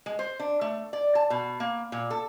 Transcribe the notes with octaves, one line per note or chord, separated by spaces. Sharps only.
G#3
C5
D4
A3
D5
A5
B2
A#3
A#2
A4